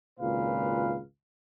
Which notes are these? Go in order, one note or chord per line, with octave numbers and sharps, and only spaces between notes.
G#1 C#2 A#2 B4 F5